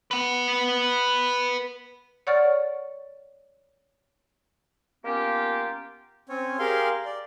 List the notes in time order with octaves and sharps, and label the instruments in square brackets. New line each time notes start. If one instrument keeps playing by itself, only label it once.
[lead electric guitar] B4 F#5
[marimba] C#5 D5 F#5 C#6 F6 A6
[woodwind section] A#3 B3 C#4 F4 G4
[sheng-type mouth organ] C4 C#4 C#5
G4 G#4 A#4 F5 C6
D5